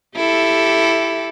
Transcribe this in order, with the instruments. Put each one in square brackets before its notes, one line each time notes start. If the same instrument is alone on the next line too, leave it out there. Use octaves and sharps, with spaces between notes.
[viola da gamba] E4 G4 A4